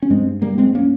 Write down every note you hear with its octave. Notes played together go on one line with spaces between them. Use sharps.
C#4
G2 G#3 C4
G3 A#3
G#3 C4
A#3 C#4